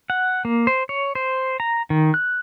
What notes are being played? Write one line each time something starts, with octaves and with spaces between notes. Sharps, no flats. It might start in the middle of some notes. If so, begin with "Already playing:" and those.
F#5
A#3
C5
C#5
C5
A#5
D#3
F#6